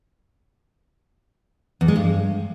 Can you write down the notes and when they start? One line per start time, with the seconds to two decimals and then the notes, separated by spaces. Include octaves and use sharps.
1.81 E2
1.88 G#3
1.96 G2